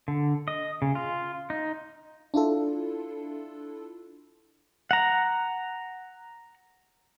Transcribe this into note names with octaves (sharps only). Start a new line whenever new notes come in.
D3
D#5
C#3
F4
D#4
D4 E4 F4 A4
F#5 A#5